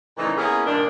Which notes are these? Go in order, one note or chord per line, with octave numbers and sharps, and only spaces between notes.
A#2 C#3 E3 F3 A3 D#4
A#3 B3 C#4 E4 G#4
G2 A#2 D#3 A#3 D4